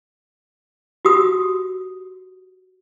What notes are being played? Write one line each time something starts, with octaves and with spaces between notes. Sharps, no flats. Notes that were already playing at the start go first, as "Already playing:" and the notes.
F#4 G4 D#6